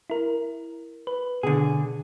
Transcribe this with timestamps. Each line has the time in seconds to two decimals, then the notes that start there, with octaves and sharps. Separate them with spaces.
0.10 E4 A#4
1.07 B4
1.43 B2 D3 G#4